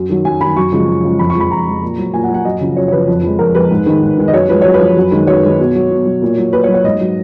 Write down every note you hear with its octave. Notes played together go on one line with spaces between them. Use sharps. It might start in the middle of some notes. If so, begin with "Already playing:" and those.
Already playing: F#2
D#3 F#3
F#2 G#5
D#3 F#3 B5
F#2 C#6
C#3 F3 G#3
F#2
C#3 F3 G#3
F2 B5
C#6
F3 G#3
B5
F2 A#5
F3 G#3
A#2
F#3
A#2 G#5
F#5
F#3
F#5
F#2 D#5
C#3 F3
F#2 C#5
C#5
C#3 F3 B4
F2
F3 G#3
F2 A#4
F3 G#3 B4
G#2
D#3 G#3
G#2
D#3 G#3
D#5
F#2 C#5
F3 G#3 B4
F#2 C#5
B4
F3 G#3
F#2
D#3 G#3
F#2 C#5
D#3 G#3
B2
F#3
B2
F#3
A#2
F#3
A#2 B4
C#5
F#3
C#5
G#2 D#5
F#3